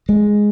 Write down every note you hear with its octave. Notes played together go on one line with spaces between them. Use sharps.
G#3